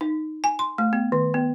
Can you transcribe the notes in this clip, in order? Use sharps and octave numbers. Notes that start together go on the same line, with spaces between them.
D#4
G#5
C6
A3
B3
D#3
B3